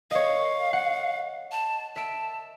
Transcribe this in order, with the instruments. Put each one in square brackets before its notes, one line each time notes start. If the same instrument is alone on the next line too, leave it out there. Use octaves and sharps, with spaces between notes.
[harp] C#5 D#5 [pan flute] F5
[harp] F#5
[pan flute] A5
[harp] E5 D7 [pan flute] A5